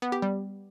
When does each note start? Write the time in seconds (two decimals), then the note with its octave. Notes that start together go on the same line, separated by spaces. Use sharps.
0.02 B3
0.12 G4
0.22 G3